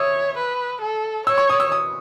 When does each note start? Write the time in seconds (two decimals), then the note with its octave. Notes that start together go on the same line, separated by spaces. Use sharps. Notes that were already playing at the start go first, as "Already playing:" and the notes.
Already playing: C#5 E5 D#6 E6
0.38 B4
0.82 A4
1.27 C#5 E6
1.38 C#6
1.50 D#6
1.60 E6
1.72 D#6